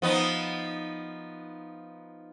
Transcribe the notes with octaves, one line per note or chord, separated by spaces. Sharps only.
F3 B3 D#4